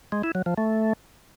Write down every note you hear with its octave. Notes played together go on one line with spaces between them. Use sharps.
G#3
E4
F#3
F3
A3